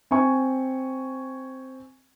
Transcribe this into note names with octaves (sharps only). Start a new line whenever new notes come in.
C4 G#5 C#6